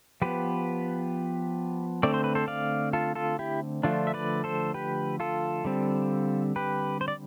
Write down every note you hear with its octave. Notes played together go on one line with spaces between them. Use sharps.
F3 B3 G4 B4
D3 A3 C4 D5
C5
B4
A4 C5
D5 F5
F4 A4
F4 A4
E4 G4
D3 F3 A3 D4 F4
E5
B4 D5
A4 C5
G4 B4
F4 A4
D3 G3 C4
G4 B4
C5
D5